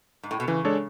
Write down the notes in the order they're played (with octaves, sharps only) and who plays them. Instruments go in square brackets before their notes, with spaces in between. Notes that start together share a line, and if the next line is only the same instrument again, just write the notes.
[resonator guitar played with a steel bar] G#2
A2
B2
[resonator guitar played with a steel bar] C#3 [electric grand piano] E3
[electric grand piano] G#3 D4 A4 C#5